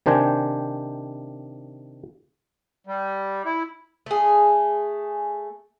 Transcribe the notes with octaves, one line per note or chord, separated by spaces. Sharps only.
C3 D#3 D4 C5 G5 G#5
G3
E4
A3 G#4